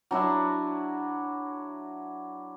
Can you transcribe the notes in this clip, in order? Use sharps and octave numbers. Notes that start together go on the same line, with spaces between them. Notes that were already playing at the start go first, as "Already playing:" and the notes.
F#3 D4 E4 E5